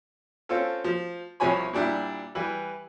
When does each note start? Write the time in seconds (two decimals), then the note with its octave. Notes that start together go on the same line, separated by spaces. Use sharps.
0.49 C4 C#4 F4 A4
0.84 F3
1.40 C2 C3 F3 C#5 G#5 B5
1.73 A#2 G3 D4 E4
2.35 E3 G3 B4